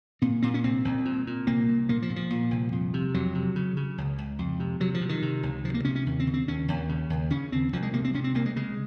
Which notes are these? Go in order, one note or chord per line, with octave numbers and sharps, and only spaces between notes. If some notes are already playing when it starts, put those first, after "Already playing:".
A#2 C4
A#2 C4
C#4
C2 C4
C2
A#2
A#2
C2 A#3
A#2
A#2 A#3
F3
A#2
F3
A#2
C2
F2
C3
F2 F#3
C3
C#3
C#3
C#2
C#2
F2
C3
C3 F#3
F3
C3
D#3
C3
C#2
C3 F3
A#3
C3 C#4
C#4
D#2
C4
C#3
C4
D#2 C#4
D#2
C#3
D#2
C#3 C#4
D#2 C4
C2 F3
G#3
C3 A#3
C4
C3 C#4
C4
C2 A#3
G#3
C#3 G#3